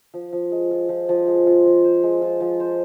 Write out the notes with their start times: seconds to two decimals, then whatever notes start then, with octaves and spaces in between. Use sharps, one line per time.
0.14 F3
0.33 F3
0.52 G#3
0.71 F4
0.89 F3
1.09 F3
1.27 G#3
1.47 F4
1.65 F3
1.84 C5
2.03 G#3
2.22 F4
2.40 F3
2.60 C5